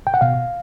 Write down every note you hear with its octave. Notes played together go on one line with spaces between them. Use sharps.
G5
F#5
B2 F5